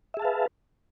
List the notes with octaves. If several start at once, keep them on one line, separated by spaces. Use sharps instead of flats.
G#4 B4 E5 F5 A5